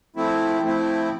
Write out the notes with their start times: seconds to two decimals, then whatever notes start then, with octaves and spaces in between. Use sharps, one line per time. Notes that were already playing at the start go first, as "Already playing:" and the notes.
0.16 F3 A3 C4 E4
0.62 F3 A3 C4 E4